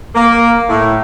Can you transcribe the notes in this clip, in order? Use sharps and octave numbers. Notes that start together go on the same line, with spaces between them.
A#3
A2